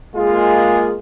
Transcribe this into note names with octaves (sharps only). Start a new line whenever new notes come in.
G#3 A#3 F4 G#4